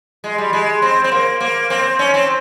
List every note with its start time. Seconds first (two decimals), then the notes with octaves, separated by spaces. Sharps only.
0.24 G#3
0.38 G3
0.53 G#3
0.82 C4
1.04 C4
1.12 A#3
1.40 A#3
1.70 C4
1.99 C#4
2.14 C4